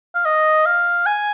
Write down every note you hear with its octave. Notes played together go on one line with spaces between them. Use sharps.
F5
D#5
F5
G#5